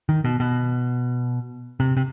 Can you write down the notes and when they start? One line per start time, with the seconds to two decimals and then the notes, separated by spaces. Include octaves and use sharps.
0.09 D#3
0.24 B2
0.40 B2
1.80 C3
1.97 C3